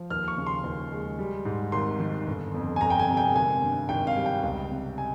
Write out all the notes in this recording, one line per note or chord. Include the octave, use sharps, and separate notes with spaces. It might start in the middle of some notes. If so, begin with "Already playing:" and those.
Already playing: F3
D#2 F6
C#6
C#3
C6
D#2
G#3
G3
G#2
G#1 C6
D#3
G1
F2
G#5
G1 A#5
G5
G#5
C3
G5
G#1 G#5
G2
G#1 G5
F5
G3
G5
C#2
C3
G#5